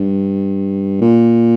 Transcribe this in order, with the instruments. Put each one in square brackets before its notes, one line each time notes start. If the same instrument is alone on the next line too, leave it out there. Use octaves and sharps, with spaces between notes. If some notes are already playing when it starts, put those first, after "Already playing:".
Already playing: [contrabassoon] G2
A#2